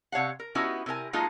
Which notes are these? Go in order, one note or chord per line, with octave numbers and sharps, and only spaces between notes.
C3 C#5 F5 F#5
A#4
B3 C#4 D#4 E4 F#4 G4
C3 E4 A#4 G#5
F#3 G#3 A#3 D#4 F4 A4